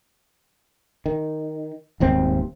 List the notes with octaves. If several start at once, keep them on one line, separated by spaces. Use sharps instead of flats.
D#3
D#1 G#1 D#2 C4